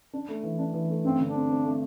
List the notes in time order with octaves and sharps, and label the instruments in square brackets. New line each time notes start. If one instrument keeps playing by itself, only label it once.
[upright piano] D4
A3
E3
D4
E3
A3
[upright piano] G2 [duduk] C4
[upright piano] D3
[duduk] D4
[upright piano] C4
C4
A3